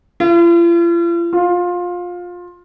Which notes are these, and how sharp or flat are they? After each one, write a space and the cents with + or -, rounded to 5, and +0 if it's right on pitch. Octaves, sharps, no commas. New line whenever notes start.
F4 -45
F4 +20